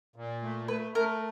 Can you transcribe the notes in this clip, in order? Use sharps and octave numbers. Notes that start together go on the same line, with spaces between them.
A#2
A3
A3 B4
A3 A#4